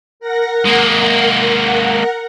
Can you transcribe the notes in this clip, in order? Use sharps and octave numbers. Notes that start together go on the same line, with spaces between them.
A#4 F#5 A#6
G#3 A#3